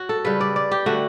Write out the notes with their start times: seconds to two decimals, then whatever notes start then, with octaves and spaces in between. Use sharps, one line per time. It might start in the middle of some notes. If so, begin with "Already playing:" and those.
Already playing: F#4 C#5
0.09 A4
0.25 C#3 G3 B4
0.41 D5
0.56 D5
0.71 G4
0.86 D3 A3 F#4